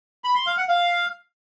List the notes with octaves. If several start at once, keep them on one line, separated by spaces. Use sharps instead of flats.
B5
C6
F5
F#5
F5